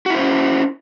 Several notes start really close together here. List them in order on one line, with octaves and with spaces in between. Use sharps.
F#4 E4 C5 C#4